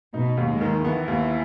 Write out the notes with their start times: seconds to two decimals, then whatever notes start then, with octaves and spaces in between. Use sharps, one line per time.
0.14 B2 D#4
0.37 D#2
0.49 G#3
0.61 D#3
0.84 E3 B3
1.08 D#2